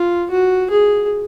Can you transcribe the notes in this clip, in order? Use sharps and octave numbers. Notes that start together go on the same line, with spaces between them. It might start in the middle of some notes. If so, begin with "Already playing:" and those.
Already playing: F4
F#4
G#4